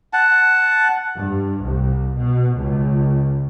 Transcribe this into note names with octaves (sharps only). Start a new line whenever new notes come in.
F#5 A5
G2
C2
B2
C#2